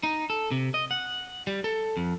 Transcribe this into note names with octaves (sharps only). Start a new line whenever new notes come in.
D#4
A4
C3
D#5
F#5
G3
A4
F2